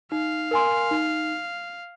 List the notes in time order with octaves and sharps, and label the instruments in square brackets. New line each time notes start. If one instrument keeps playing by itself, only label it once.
[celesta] D#4 [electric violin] F5
[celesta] A#4 G#5 C6
D#4